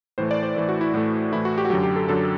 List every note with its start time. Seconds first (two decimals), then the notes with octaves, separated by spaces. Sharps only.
0.18 A2 E3 A3 C5
0.31 D5
0.43 C5
0.56 A2 E3 A3
0.69 F#4
0.81 E4
0.94 A2 E3 A3
1.32 A2 E3 A3 E4
1.45 F#4
1.58 G4
1.65 F#4
1.70 F#2 D3 F#3 G4
1.83 G4
1.96 A4
2.09 F#2 D3 F#3 A4